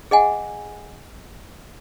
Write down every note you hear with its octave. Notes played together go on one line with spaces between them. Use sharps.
G#4 D#5 F#5 G#5